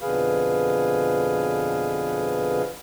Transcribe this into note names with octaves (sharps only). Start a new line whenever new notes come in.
F2 B2 D3 G#4 B4 F5